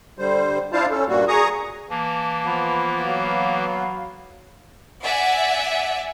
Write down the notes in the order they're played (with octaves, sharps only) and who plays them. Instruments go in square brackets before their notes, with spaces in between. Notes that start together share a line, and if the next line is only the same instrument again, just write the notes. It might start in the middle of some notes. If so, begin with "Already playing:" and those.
[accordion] D3 G3 C5
D4 E4 F4 C5 F5 A5
C#4 A4
G2 A#2 G3 A#3 F#4
G#4 A#5 C#6 D#6
[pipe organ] E3 A#3 [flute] A5
[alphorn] F3 [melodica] B3
[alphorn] F#3 [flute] F5
[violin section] D5 E5 F#5 G#5